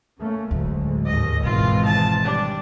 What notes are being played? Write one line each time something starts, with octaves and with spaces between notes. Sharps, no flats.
A3 A#3 C#4
D2 A2 F#3 G#3
D#2 G#2 D#5
G#1 G#2 B2 D#3 E3 F4
A5
G3 D4